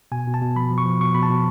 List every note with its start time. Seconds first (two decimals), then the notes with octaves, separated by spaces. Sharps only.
0.12 B2 G#5
0.27 B2
0.34 A5
0.41 B2
0.56 F3 B5
0.70 F3
0.78 C#6
0.85 F3
1.01 B2 C#6
1.14 B2 B5
1.23 A5
1.30 B2